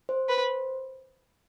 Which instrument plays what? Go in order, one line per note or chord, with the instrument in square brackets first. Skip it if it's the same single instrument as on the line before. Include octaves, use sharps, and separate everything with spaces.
[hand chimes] C5
[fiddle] B4